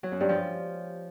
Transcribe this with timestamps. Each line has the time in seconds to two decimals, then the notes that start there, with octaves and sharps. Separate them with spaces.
0.03 F#3
0.12 F#2
0.20 G2
0.29 F3